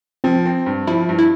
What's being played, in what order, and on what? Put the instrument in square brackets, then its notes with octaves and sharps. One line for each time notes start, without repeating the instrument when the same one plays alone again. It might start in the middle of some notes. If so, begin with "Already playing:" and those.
[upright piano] F3 [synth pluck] C4
[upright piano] C4
G2
[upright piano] F3 [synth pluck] E4
[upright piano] G2
[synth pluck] E4